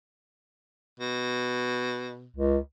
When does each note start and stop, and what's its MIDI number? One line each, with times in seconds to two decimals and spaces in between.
1.00 2.28 47
2.36 2.58 37